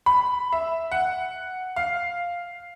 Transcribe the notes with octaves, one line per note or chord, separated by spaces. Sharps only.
B5
E5
F#5
F5